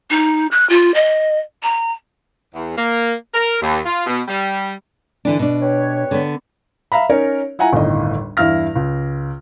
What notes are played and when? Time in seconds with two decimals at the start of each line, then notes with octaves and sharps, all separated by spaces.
0.10 D#4
0.51 F#6
0.69 F4
0.94 D#5
1.62 A#5
2.54 E2
2.77 A#3
3.34 A#4
3.61 D#2
3.85 F4
4.06 B2
4.28 G3
5.25 D3 E3 D4
5.39 B2 D4
5.60 G4 B4 C#5
6.11 D3 B3
6.92 E5 F5 A#5 B5
7.09 C#4 D#4 A#4 C#5
7.59 E4 F4 F#5 G#5 A#5
7.73 G1 D#2 A2 D#5
8.37 E2 G2 E4 F5 F6 A#6
8.75 C#2